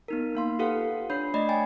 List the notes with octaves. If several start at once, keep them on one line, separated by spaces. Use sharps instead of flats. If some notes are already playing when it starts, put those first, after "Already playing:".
B3 D#4 A#4
A#3 F5 C6
F4 G4 A4 B4 F5 F#5
D4 C#5 B5 G6 C7
A3 D5 D#5 B5
G5 G#5 G#6 A6